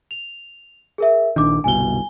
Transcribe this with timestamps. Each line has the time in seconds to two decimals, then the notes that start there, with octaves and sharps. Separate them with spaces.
0.11 F7
0.98 G#4 A#4 E5
1.36 A#1 D#3 D4 D6
1.64 G1 C2 B2 G#5 G7